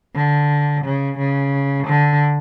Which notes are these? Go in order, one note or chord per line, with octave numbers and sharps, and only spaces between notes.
D3
C#3
C#3
D3